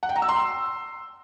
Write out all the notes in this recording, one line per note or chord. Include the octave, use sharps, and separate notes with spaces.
F#5
G5
A#5
E6
C6